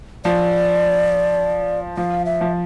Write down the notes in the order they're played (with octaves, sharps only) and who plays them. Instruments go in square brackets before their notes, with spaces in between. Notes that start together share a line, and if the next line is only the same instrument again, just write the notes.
[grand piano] F3 [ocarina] D5
[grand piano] F3 [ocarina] F5
[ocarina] E5
[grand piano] F3